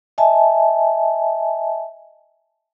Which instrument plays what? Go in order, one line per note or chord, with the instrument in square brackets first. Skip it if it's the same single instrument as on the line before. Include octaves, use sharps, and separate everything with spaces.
[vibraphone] D#5 E5 G#5 A5